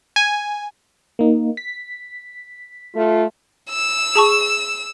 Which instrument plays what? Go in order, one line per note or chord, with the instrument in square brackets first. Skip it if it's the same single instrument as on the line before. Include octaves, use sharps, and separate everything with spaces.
[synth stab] G#5
[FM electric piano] A#3 D#4
B6
[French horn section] A3 F4
[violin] E6
[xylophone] G#4 A5 C#6